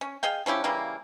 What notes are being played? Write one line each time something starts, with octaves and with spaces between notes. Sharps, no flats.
C#4
G#4 D#5 F5 G5
F3 C#4 E4 G4
C#3 E3 G3 A#3